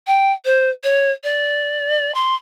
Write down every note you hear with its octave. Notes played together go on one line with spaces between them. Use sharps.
G5
C5
C#5
D5
C6